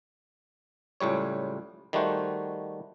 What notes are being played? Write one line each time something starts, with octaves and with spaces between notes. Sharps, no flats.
C#2 A2 G3 C#5
D#3 G3 A3 F#4 C5